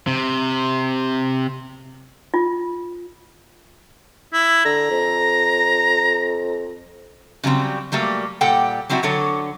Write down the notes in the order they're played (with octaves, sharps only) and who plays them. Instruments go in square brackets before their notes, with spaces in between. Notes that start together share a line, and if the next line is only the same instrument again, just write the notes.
[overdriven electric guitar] C3
[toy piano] F4
[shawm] E4
[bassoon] D3 [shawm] A#5
[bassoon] F2
[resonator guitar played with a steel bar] C#3 F#3 G3 C4
F#3 G3 A3 A#3
A#2 G3 A4 F#5 G5
F#3 G3 C4 E4 F#4
D3 F#3 A4 C#5